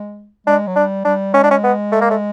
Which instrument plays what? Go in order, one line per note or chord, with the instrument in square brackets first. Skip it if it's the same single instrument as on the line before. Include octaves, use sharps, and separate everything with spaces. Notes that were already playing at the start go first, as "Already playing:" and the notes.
Already playing: [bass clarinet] G#3
[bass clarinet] G#3 [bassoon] D4
[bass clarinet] F#3
[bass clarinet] G3 [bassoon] D4
[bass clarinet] G3 [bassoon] D4
[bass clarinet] G#3 [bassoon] C#4
[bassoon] D4
C#4
B3
A3
A#3
A3